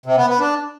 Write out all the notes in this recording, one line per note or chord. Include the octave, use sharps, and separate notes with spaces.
C3
B3
B3
D4